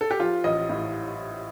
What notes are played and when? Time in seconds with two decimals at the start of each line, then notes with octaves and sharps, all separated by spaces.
0.01 A4
0.11 G4
0.19 F3 F4
0.44 A1 D#5
0.69 A2